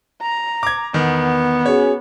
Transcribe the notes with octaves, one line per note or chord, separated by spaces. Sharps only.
A#5
D6 G#6
E2 D#3 B3
C#4 F#4 G#4 C#5